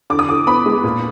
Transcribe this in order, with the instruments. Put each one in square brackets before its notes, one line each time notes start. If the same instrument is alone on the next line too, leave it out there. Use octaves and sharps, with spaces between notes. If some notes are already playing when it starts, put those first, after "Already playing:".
[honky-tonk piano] D3 D6
D#6
D3 D6
B3 B5
G#3
A#2